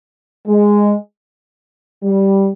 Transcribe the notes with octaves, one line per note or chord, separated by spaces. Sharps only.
G#3
G3